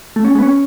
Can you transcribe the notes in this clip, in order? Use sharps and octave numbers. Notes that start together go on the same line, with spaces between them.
A3
C#4
G#3
B3
C#4